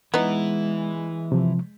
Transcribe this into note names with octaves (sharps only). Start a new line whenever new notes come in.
E3 G#3 B3 D#4 E4
C3 F3